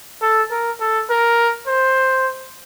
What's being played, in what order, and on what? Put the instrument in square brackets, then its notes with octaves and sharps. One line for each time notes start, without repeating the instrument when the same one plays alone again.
[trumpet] A4
A#4
A4
A#4
C5